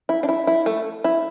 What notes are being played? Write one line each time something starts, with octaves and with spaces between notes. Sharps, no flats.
E4
D4
E4
E4
A3
E4